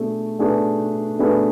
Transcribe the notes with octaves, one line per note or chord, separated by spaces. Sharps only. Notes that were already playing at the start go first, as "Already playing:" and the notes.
Already playing: B2 A3 D4 G#4
B2 A3 D4 G#4 B4
B2 A3 D4 G#4 B4